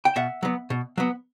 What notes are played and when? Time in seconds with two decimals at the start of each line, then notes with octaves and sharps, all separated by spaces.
0.05 G5
0.16 B2 E5 F#5
0.43 F#3 B3
0.70 B2
0.98 F#3 B3